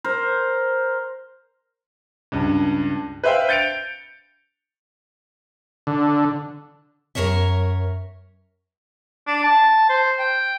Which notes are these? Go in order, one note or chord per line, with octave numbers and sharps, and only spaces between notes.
A#4 C5
C#2 G2
B4 C5 E5 F5 G5
G6 A6 C#7 D7 F7
D3
F#2 C3 A#4 C#5 E5
D4
A5
C5
G5